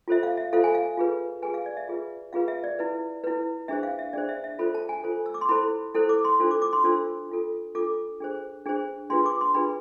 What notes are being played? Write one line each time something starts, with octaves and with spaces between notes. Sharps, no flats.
F4 A4 C5 E5
F5
E5
F4 A4 C5 F5
G#5
F5
F4 G#4 B4
F4 G#4 B4 G#5
F5
D5
E5
F4 G#4 B4
F4 G#4 B4 F5
E5
D5
E4 B4
E4 B4
D4 G#4 C5 E5
F5
E5
D4 G#4 C5 D5
E5
E5
F4 A4 C5 B5
A5
G#5
F4 A4 C5
E6
D6
C6
E4 A4 C5 B5
E4 A4 C5
D6
C6
D4 F4 A4 C5
D6
D6
C6
D4 F4 A4 C5 E6
D4 F4 A4
D4 F4 A4 D6
D4 G#4 C5
D4 G#4 C5
D4 F4 G#4 B4 C6
D6
C6
D4 F4 G#4 B4 B5